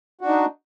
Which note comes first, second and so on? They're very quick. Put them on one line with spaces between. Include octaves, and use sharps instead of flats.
F#4 D4 D#4